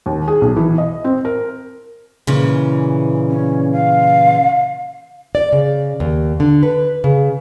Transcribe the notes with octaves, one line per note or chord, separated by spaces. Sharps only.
D#2
G#4
B1
E3
D#5
C4
A#4
A#2 C#3 E3
C#4
F5
D5
C#3
D#2
D3
B4
C#3